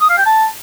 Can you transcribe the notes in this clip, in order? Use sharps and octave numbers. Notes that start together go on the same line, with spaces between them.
D#6
F5
G5
A5